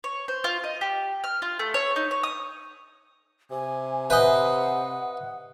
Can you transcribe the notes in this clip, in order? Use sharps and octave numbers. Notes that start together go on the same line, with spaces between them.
C#5
C5
F4
D#5
G4
F6
F4
A3
C#5
D#4
C#5
D#6
C3 G#5
B4 C5 D#5 E5 F#5 G#5